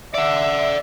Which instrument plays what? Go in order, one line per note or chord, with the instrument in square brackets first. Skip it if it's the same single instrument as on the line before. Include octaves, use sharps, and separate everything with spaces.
[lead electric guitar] D5 F#5 [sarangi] E5